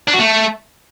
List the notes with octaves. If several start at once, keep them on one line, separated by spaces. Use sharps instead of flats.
D4
F#4
A3